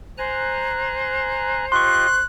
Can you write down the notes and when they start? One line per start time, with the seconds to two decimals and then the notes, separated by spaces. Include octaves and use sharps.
0.18 C5 G#5 A#5 F#6
1.72 F4 G4 D#5 C6 C#6 F#6